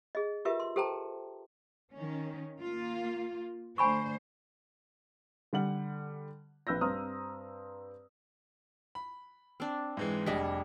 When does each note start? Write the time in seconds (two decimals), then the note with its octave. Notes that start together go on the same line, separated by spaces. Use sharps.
0.15 G#4 D#5
0.45 F4 G4 A#4 B4 E5
0.60 C6
0.76 G4 A4 C5 G5 A5 A#5
1.93 D#3 C#4
2.60 A#3 F4
3.78 D3 A3 C5 G#5 B5 C#6
5.53 D3 G3 F#5 F#7
6.67 A#1 B4 E6 G6 A#6
6.81 G2 C4 C5 A#5 D#6 F6
8.95 B5
9.60 C4 D4
9.97 G#2 E3 G#3
10.26 F1 G3 D4 G#4 D#5 B6